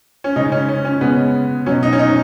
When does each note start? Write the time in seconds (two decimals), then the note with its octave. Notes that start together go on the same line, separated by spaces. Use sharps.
0.24 C#4
0.36 C#3 G#3 D#4
0.52 C#4
0.69 C#4
0.85 C#4
1.01 C#3 G#3 B3
1.66 B2 F#3 C#4
1.83 D#4
1.93 C#4
1.99 D#4